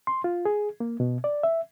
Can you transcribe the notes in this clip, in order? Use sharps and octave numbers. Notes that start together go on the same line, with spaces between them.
C6
F4
G#4
A#3
B2
D5
E5